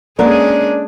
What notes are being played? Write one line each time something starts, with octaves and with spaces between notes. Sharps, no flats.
G#3 A#3 C#4 D4 G#4 A#4 B4 D5